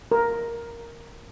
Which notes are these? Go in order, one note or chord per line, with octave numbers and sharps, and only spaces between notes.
A#4